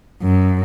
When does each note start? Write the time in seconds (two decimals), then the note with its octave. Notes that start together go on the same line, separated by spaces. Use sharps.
0.22 F#2